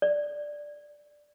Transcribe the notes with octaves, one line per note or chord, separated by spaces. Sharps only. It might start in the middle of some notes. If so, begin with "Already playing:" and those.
D5